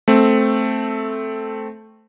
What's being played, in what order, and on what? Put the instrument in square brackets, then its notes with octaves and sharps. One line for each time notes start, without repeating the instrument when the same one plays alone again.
[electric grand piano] A3 C4